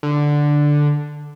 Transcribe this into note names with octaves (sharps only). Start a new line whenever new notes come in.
D3